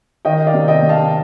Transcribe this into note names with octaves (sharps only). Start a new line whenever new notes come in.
D#3 D#5 G5
D5 F5
C3
D#5 G5
C3
F5 A5